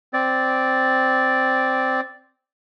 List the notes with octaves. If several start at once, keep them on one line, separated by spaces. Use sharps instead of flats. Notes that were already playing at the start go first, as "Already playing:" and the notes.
C4 D5